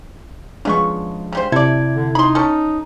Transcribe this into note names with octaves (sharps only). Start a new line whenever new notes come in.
C#3 F3 G#3 B3 D4 C#6
C#3 G3 C5
C3 E4 A4 D5 G#6
D3
D#4 B5 C6
C#4 A4